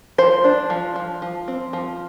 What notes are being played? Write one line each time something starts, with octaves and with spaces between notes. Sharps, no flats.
F3 C5
D4
F3
F3
F3
C4
F3